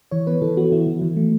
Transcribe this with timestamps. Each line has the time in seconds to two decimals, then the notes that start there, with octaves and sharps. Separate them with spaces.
0.11 E3 C#5
0.27 B3 B4
0.42 E3 A4
0.57 B3 F#4
0.72 E3 E4
0.87 E3
1.02 E3
1.17 A3